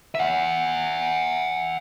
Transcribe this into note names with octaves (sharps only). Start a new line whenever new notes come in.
E5 F#5